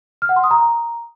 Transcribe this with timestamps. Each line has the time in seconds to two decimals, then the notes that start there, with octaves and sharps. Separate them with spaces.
0.22 F6
0.29 F#5
0.36 C6
0.44 D#6
0.51 A#5